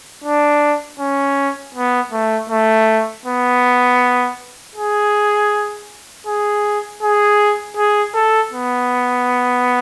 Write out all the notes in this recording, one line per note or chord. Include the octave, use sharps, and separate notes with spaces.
D4
C#4
B3
A3
A3
B3
G#4
G#4
G#4
G#4
A4
B3